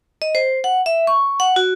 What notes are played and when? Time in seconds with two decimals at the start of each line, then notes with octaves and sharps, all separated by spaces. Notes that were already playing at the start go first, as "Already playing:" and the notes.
0.22 D#5
0.35 C5
0.64 F#5
0.86 E5
1.07 C#6
1.40 F#5
1.56 F#4